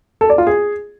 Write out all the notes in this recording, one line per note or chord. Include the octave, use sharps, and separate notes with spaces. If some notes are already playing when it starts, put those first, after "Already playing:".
A4
D5
F4
G#4